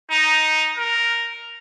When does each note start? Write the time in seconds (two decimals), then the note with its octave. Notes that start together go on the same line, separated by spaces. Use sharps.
0.11 D#4
0.77 A#4